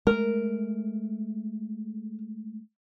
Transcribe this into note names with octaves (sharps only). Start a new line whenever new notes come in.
G#3 A3 A#4